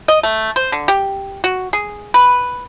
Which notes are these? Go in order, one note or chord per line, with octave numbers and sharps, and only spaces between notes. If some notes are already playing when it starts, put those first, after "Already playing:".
D#5
A3
C5
D3
G4
F#4
G#4
B4